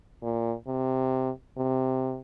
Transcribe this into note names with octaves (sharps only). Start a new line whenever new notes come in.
A#2
C3
C3